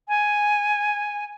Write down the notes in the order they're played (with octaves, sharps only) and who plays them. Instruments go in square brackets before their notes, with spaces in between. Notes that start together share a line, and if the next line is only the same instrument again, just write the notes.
[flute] G#5